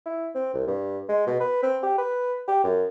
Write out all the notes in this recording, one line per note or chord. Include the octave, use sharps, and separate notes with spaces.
E4
C4
C2
G2
G#3
B2
B4
C4
G4
B4
G4
F#2